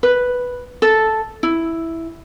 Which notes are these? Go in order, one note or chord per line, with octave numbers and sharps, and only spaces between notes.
B4
A4
E4